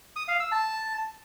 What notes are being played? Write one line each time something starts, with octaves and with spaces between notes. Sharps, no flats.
D#6
F5
E6
A5